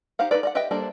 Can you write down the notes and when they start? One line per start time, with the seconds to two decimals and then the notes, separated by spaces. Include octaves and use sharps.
0.19 D#4 G4 C5 F5 F#5
0.31 D#4 F4 A4 B4 D5
0.43 D5 D#5 F#5
0.55 G4 B4 D#5 E5 G5
0.71 G3 A#3 D4 A4 C5